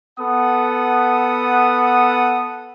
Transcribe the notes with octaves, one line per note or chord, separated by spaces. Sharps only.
B3 A4 F#5 D#6